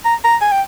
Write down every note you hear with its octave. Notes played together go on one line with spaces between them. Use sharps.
A#5
A#5
G#5
G5